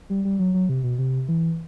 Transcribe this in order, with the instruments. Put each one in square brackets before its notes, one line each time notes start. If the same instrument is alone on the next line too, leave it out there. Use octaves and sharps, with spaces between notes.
[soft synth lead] G3
G3
F#3
F#3
C3
B2
C3
E3